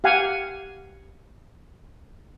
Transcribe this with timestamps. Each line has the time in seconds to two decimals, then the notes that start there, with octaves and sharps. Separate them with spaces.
0.04 G4 F5 F#5 G#5